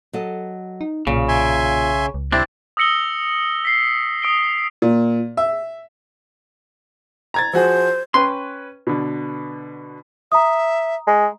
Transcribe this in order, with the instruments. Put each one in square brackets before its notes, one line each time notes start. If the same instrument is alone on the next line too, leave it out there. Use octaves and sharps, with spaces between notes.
[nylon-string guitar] F#3 A4 D#5
[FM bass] D#4
[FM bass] B1 [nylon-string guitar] A#2 [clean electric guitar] C#3
[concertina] E5 G#5 C6
[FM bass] C#2
[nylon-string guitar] C3 G3 [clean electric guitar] C4 D4 [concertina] E4 C5
[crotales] D#6 E6 A#6 C#7 F#7 G7
B6 C7
D#6 D7 G7
[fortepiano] A#2
E5
[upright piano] A#5 G#6 A6
[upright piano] F3 F#4 G#4 [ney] C5
[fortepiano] C#4 B4 G5 [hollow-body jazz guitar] C6
[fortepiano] B2 D3
[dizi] E5 [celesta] A#5 D#6
[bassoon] G#3